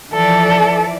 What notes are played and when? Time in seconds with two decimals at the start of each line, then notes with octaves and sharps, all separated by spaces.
0.13 E3 F3 A4 D5